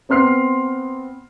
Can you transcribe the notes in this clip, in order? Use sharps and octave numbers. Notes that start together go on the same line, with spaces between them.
B3 C4 C6 F6 C7